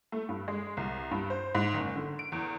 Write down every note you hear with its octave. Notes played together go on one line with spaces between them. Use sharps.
A3
G2
G#3
C2
G2
C5
G#2
F#1
D3
D7
E2